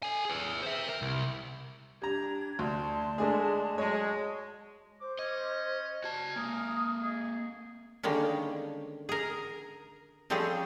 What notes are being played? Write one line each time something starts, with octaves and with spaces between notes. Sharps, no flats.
A4 G#5
G#4 B4
C5 E5
A#4
C2
G3 D4 A#5 G#6
D2 D5 A5 C6
G#3 A3 D4 G#4
F#3 G#3 C#5
C5 D6
C#4 D#5
F#4 D5 G#5 A5
G#3 A#3 A#4 D#6
G#4 D#5
D3 D#3 G3 G#3 A#3 C#4
G#4 A#4
F3 G3 A3 C4 C#4 G#4